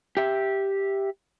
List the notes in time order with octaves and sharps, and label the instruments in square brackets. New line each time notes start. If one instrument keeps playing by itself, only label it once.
[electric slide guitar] G4 E5